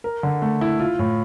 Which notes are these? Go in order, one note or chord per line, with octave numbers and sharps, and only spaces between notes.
A#4
D3
A3
E4
F4
A2